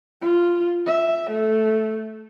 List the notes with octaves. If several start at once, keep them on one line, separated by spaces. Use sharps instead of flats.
F4
E5
A3